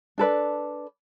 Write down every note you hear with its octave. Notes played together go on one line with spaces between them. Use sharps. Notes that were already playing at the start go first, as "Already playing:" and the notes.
D4 A4 B4 D5